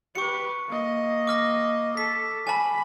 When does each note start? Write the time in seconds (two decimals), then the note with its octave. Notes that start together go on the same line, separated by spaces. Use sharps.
0.15 G4 B4 C#6 C#7
0.68 A#3 D#5
1.27 D6 F6 A#6
1.97 A4 B6
2.47 G#5 A5 B5